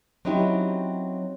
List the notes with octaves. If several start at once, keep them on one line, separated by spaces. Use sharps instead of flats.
F#3 C4 C#4 D#4 E4 G4